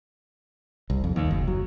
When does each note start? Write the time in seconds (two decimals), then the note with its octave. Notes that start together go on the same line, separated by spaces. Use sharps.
0.90 C2
1.04 F2
1.16 D#2
1.31 F#1
1.48 F#3